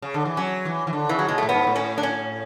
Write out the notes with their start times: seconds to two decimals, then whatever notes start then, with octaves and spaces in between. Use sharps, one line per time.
0.02 C#3
0.14 D3
0.25 E3
0.37 F#3 C#4
0.65 E3
0.87 E3
0.93 D3
1.09 C#3 E3
1.19 F#3
1.28 B2 G#3
1.38 A2 A3
1.49 B3
1.54 G#2
1.67 A2
1.76 C#4
1.98 D4
2.03 C#4